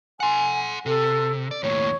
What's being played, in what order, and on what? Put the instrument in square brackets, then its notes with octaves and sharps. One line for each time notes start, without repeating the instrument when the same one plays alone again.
[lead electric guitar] F#5 C6 [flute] G#5
[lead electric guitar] C3 [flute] A4
[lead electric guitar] D5
[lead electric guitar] D#2 A2 [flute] C#5